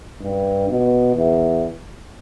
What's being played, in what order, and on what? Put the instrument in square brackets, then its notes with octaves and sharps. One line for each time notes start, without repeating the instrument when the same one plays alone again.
[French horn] G2
B2
E2